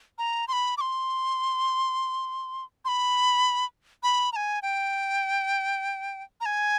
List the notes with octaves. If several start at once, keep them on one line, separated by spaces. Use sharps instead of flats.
A#5
C6
B5
D6
C6
C6
B5
B5
A#5
G#5
G5
A#5
G#5